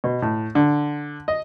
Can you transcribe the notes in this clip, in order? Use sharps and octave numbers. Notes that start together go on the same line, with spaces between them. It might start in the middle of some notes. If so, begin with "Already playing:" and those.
B2
A2
D3
D#5